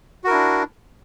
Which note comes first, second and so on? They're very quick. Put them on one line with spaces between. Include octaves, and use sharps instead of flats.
F#4 A#4 E4 D4